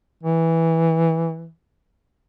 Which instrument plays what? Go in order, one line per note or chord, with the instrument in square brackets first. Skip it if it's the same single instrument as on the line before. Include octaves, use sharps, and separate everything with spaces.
[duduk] E3